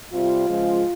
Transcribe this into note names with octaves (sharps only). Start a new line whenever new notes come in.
C3 G3 F4
C#3 F3 G#3